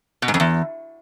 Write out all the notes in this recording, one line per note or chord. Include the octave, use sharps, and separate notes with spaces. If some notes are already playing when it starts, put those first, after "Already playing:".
B2
G#2
F2
E2